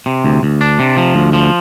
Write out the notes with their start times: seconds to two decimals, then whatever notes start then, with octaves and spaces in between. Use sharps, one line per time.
0.06 C3
0.25 D2
0.43 D2
0.61 D4
0.79 C3
0.97 F3
1.15 D2
1.33 F3